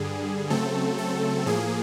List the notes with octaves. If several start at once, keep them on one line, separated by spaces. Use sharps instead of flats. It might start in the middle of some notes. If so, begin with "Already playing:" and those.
Already playing: G2 D3 G3 G#4
C#3 F#3 A3 C4 A4
A4
A2 F3 A#3 G#4